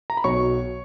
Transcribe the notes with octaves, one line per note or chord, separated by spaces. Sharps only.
A#5
B5
B1 B2 F#3 B3 C#5 C#6